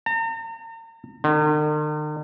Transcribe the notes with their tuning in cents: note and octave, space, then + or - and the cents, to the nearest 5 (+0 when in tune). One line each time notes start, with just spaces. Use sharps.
A#5 -40
D#3 -45